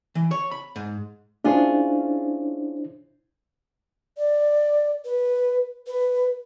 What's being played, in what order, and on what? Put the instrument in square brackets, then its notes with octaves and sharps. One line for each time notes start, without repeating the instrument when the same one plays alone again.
[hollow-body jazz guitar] E3
C#5
B5
G#2
[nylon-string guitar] C#4 F4 G#4 [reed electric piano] D4 E4 C5
[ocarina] D5
B4
B4